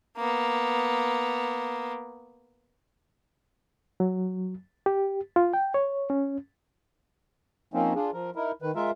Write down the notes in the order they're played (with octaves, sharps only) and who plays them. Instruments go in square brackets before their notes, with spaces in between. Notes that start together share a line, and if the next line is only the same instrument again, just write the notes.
[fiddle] A#3 B3
[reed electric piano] F#3
G4
F4
G5
C#5
C#4
[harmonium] F3 A#3 C4 C#4 D#4
D4 F4 G#4
F3 A#4
D#4 E4 A#4
D#3 B4
G#3 F4 A#4 E5